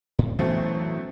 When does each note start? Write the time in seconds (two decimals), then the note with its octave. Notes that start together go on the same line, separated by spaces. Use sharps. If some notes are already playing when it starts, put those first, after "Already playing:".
0.19 A2
0.39 B2 E3 F#3 A3 C4 C#4